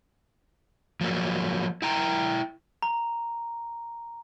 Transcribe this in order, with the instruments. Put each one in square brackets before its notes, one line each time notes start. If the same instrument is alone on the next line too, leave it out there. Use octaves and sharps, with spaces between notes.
[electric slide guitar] F3 F#3 A#3
E4 G5 A#5
[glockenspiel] A#5